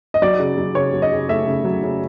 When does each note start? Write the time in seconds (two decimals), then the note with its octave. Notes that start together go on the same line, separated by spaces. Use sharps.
0.14 D#5
0.22 F#3 D5
0.39 C#3
0.58 F#3
0.75 C#3 C#5
0.93 F#3
1.02 D#5
1.12 C#3
1.29 A3 E5
1.47 C#3
1.65 F#3
1.83 C#3